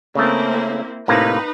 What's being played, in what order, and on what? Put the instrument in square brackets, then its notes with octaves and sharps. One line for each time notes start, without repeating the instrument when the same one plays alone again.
[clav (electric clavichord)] C#3 A3 [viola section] A#3 C4 E4
[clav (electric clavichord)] A2 C3 A#3 [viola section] D#4 B4